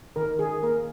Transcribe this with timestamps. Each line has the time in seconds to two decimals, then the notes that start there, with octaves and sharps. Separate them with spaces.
0.16 D#3 A#4
0.39 D#3 G#4
0.63 A#3 A#4